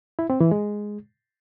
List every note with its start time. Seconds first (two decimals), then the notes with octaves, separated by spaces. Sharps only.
0.19 E4
0.30 C4
0.40 E3
0.51 G#3